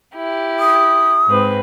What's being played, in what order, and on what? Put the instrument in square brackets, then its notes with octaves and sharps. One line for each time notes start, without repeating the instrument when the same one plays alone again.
[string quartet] E4 G4
[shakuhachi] D#6
[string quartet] G#2 C4 B4